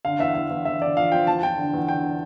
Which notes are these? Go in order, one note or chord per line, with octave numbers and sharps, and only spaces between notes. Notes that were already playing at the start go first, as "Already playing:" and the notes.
D3 F5
E2 E5
E2 F5
E2
E2 E5
D3 D5
F3 F5
F3 G5
E2 A5
F3 G5
D3
E2
D3 G5
D3